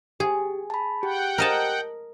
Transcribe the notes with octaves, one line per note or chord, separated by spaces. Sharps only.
G4 G#4
A5 B5
G4 F#5 G5
A#4 D#5 A5